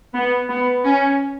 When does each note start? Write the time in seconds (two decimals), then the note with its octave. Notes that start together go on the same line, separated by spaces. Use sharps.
0.14 B3
0.49 B3
0.85 C#4